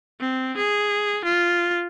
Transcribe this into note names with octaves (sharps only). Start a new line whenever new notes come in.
C4
G#4
F4